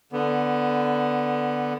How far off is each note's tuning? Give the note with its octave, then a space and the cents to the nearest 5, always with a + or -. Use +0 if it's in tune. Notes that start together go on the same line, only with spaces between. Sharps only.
D3 +0 B3 +0